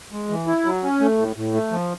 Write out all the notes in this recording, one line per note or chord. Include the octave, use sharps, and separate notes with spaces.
G#3
E3
E4
F#3
C#4
A3
A2
A2
A3
F3